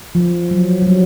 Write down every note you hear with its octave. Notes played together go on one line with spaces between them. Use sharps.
F3
F#3
F#3
G3